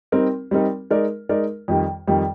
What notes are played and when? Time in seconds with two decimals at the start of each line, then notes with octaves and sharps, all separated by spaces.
0.12 G3 C4 D#4 A#4
0.51 G3 C4 D#4 A#4
0.90 G#3 D#4 A#4 D5
1.29 G#3 D#4 A#4 D5
1.68 F2 D#3 G3
2.07 F2 D#3 G3